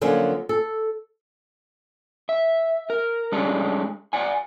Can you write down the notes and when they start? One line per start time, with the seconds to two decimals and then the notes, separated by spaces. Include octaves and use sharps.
0.01 D3 F3 F#3 A#3 C#4
0.49 A4
2.29 E5
2.90 A#4
3.32 G3 G#3 C#4 D4 A4
4.13 D5 F#5 G#5